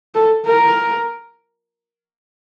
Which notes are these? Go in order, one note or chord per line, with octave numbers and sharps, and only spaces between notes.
A4
A#4